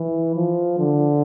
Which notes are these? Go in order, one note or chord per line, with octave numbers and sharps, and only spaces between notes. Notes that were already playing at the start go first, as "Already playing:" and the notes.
Already playing: E3
F3
D3